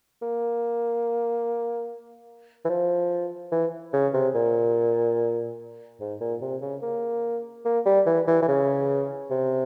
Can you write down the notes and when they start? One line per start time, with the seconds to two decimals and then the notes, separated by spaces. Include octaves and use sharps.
0.22 A#3
2.65 E3
2.69 F3
3.52 E3
3.93 C#3
4.14 C3
4.35 A#2
6.00 G#2
6.21 A#2
6.41 C3
6.61 C#3
6.82 A#3
7.65 A#3
7.86 G3
8.06 E3
8.27 E3
8.42 E3
8.48 C#3
9.31 C3